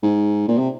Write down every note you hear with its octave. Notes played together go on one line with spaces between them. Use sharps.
G#2
A#2
C3